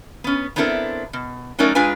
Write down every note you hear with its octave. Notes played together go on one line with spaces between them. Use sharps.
B3 C#4
B3 C4 D4 E4 A4 A#4
B2
F#3 A3 C#4 D#4 A#4 D5
G#2 G#3 D4 F4 B4 G#5